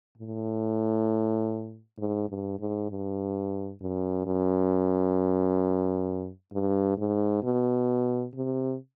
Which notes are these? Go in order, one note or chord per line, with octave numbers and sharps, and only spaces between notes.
A2
G#2
G2
G#2
G2
F#2
F#2
G2
G#2
B2
C3